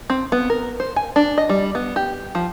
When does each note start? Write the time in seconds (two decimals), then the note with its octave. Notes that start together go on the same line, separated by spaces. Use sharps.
0.10 C4
0.32 B3
0.50 A#4
0.80 C5
0.96 G#5
1.16 D4
1.38 D#5
1.49 G3
1.75 B3
1.96 G4
2.35 F3